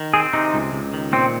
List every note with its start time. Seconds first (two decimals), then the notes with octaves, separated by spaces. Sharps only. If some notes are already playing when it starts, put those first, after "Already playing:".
Already playing: D#3
0.14 C4 G#4
0.33 C3 D#4
0.54 C#2
0.73 C#2
0.94 D#3
1.13 A#2 C4